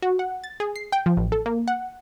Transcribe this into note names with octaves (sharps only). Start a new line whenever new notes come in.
F#4
F#5
A6
G#4
C7
G5
F3
A1
A4
A#3
F#5